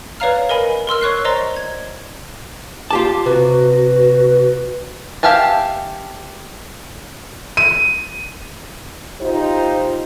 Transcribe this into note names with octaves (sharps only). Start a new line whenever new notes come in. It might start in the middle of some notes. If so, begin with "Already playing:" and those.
B4 C#5 D5 F5 A#5 F6
A#4 D#5 G#5 B5
A#4 C6 E6 F6
C#5 C#6 F#6 C7
C5 D5 D#5 A#5 C6
G#6
F4 G4 A5 D6
C3 F#4 B4
G4 E5 F5 G#5 A5
D#7
D#4 F4 G4 C5